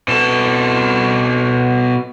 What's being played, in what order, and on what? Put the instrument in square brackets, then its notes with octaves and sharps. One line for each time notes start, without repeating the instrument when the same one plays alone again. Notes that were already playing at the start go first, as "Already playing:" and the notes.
[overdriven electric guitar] B2 A4